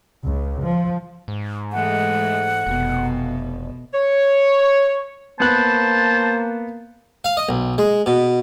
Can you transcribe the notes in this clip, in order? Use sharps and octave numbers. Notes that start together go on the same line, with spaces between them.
C#2
F3
G#2
E3 G#3 A3 F#5
F1 B2
C#5
A#3 B3 C5 A5 F#6
F5
D#5
B1
G#3
B2